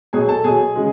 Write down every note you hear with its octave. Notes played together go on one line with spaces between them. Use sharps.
B2 F#3 G#4 G#5
A4 A5
B2 F#3 G#4 G#5
C#3 G#3